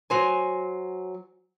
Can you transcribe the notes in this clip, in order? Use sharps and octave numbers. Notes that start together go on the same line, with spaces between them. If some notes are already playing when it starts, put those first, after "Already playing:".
F#3 C5 G#5